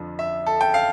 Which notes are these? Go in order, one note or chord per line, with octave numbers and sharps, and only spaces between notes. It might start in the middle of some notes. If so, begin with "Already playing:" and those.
Already playing: F2 D3 F3
E5
A4
G5
F5